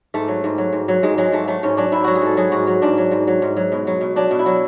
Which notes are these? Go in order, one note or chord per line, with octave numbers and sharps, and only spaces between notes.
G#2 A3
F#3
G#2
F#3
G#2
F#3
G#2 G#3
F#3 G#3
G#2 A3
F#3 A3
G#2 C#4
F#3 D4
G#2 E4
F#3 F#4
G#4
G#2 A4
F#3 G#4
G#2 F#4
F#3
G#2 D4
F#3
G#2
F#3
G#2
F#3
B2
F#3
B2
F#3 D4
B2
E4
F#3